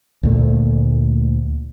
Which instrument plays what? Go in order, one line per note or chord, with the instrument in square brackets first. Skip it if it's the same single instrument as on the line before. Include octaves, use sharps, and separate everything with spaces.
[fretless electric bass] D2 A#2 A3